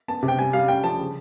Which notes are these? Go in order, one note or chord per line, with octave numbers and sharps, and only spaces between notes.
B3 A5
C3
G5
G3 G#5
G3 F5
C#4 G5
F3 A5
C#3